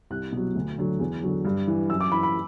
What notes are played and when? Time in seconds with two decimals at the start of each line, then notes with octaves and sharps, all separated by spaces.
0.10 C2 F#6
0.32 B2 F#3
0.55 D2
0.78 D3 F#3
1.00 E2
1.22 D3 F#3
1.45 G2
1.67 E3
1.89 F#2 E6
2.00 D6
2.12 E3 B5
2.23 B5